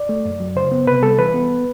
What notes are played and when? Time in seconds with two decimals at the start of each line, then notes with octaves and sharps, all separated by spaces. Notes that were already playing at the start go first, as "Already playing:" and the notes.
Already playing: D5
0.09 A3
0.25 F#2
0.40 F#3
0.56 C#3 C5
0.72 B3
0.87 C3 B4
1.02 G3 A4
1.19 E3 B4
1.34 B3